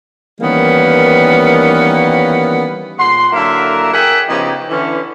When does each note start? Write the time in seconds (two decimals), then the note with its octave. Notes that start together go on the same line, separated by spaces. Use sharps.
0.41 D#3 E3 G3 A#3 B3 C#4
2.99 A#2 G#4 F#5 C6
3.33 D3 F#3 A#3 E4 A#4 E5
3.93 G#4 A#4 E5 F#5 G5
4.28 C#3 F3 B3 D#4 F4 G4
4.70 D3 E3 C#4